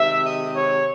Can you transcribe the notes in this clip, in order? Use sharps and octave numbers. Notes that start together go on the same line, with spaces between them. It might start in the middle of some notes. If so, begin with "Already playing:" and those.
Already playing: C3 D#3 G#3 E5
D#5
C#5